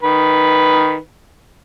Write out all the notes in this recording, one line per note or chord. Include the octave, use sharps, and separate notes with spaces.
D#3 B4